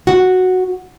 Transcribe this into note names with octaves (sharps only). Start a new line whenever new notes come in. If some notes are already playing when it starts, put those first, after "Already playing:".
F#4